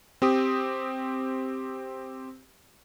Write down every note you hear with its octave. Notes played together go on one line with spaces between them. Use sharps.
C4 G4 D#6